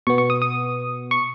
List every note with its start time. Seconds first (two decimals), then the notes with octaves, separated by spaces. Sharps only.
0.07 B2 B3 C#6
0.18 C#6
0.30 D#6
0.42 D#6
1.11 C#6